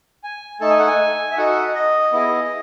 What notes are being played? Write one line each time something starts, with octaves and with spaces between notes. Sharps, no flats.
G#5
A3 D#4 A4 A5
G#5
F#5
G#5
E5
D#4 F#4 A4 F#5
D#5
B3 E4 G#4